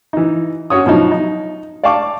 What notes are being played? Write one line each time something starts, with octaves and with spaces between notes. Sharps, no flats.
E3 D#4
C#4 F#4 C#5 D#6
B2 F3 F#3 D#4
D#4
D5 F5 G5 A5 C#6 D6